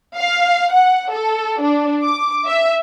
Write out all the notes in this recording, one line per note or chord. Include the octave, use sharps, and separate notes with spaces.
F5
F#5
A4
D4
D6
E5